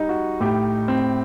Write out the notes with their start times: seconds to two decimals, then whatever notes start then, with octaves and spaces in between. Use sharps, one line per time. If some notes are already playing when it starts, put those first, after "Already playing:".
Already playing: G3 D#4
0.09 F#4
0.40 A2 G4
0.88 C4